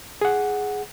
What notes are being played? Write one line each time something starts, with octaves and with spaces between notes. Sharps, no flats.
G#4 F#5